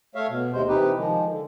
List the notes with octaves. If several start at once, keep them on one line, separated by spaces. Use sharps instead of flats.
A3 C#5 E5 F5
B2
D#2 C3 G#3 C5
C3 E3 D#4 G4 B4
D#3 F3 G#3
D3